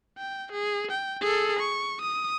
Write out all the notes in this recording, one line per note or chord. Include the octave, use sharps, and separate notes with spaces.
G5
G#4
G5
G#4 A4
C#6
D#6